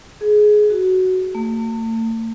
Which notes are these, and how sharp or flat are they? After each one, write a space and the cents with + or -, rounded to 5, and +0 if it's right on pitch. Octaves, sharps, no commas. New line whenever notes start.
G#4 +15
F#4 +10
A3 +45